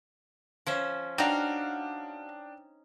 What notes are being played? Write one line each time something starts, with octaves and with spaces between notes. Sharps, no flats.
F3 C#4 E5
D4 D#4 F#4 F5 G5